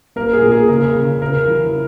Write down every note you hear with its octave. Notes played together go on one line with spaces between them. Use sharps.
A#3 A#4
G#4
A#2
G#4
C#3 A#4
C#3
C#3 A#4
E3